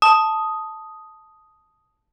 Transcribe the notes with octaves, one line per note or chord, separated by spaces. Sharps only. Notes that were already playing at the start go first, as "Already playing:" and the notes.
A5 D#6